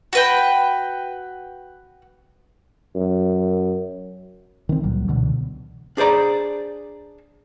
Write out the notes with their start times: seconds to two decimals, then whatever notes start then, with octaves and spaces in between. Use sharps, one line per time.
0.13 F#4 B4 G5
2.95 F#2
4.69 D#3 E3 C4
4.83 C#2 A#2 F#3 G3
5.08 C#2 B2 D3 E3
5.97 D4 G#4 C5 D5 A#5